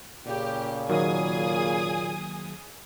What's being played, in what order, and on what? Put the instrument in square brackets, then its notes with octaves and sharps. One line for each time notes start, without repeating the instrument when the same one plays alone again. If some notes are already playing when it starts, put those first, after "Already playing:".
[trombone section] A#2 C#3 [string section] G4
[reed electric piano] D#3 F#3 A#3 [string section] G#4 G#5 D#6